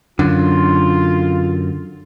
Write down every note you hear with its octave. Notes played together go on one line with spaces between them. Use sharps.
F#2 D3 F4